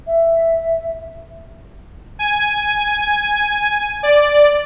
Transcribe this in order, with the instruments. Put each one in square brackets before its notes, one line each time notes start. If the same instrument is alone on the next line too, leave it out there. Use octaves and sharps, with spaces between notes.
[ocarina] E5
[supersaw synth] G#5
D5